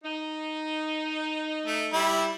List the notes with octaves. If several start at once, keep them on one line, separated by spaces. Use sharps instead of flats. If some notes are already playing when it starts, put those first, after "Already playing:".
D#4
A3
G3 E4